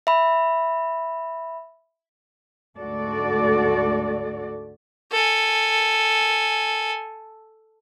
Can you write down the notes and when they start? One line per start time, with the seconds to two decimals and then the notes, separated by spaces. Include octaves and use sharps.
0.07 E5 B5
2.77 D2 G#2 F#4 A4 D5
5.12 A4 G#5